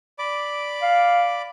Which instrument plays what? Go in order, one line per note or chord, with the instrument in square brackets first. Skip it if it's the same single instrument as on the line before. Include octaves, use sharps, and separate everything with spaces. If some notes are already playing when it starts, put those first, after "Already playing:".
[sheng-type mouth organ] D5 B5 D6
[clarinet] F5